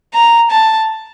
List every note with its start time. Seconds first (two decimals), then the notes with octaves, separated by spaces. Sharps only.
0.14 A#5
0.51 A5